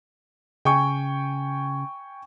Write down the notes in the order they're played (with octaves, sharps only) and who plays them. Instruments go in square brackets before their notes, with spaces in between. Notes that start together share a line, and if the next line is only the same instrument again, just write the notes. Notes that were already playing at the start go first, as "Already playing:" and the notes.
[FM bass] C#3 [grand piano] G5 G#5 C#6